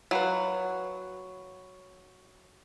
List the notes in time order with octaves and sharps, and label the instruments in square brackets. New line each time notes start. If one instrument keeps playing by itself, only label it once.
[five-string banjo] F#3 [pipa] E4 F4 B4